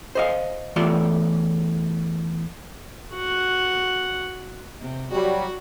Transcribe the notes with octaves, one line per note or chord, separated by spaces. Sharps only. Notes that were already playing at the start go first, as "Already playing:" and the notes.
C5 D#5 F5
E2 E3 A3 F4 D5 C6
F#4 F#5
C3
F#3 G3 F#4